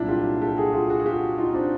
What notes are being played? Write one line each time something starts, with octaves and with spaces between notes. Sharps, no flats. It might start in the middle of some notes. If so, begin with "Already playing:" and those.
Already playing: C2 A#2 F#3 D4 E4
F4 G4
G4 A4
F#4 G#4
F4 G4
F#4 G#4
F#4
F4 G4
D#4 F4
C4 D4